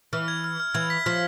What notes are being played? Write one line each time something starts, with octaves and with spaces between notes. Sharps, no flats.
E3 F6
G#6
F6
F6
E3 G#6
B6
F3 F6